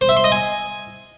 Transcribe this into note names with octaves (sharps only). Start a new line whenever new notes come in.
C5
E5
C6
D#5
G#5